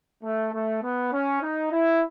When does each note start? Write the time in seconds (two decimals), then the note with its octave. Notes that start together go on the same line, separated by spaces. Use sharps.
0.23 A3
0.53 A3
0.83 B3
1.12 C#4
1.41 D#4
1.71 E4